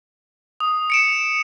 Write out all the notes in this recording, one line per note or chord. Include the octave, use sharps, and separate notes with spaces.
D#6
C#7 D7 E7